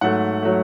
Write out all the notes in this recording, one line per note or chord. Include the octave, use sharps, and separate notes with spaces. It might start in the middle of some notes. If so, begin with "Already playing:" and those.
G#2 F#3 A3 F#5
F#3 A3